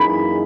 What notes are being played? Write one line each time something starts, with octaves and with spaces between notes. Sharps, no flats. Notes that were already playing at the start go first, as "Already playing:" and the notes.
Already playing: F#2 E3 A#3 D#4 G#4 B5